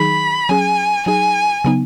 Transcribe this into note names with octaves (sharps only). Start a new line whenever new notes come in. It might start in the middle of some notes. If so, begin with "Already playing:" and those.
Already playing: D#3 F#3 D#4 G#4 B5
F#3 C#4 G#4 G#5
F#3 D#4 G#4 G#5
C#3 F#3 B3 D#4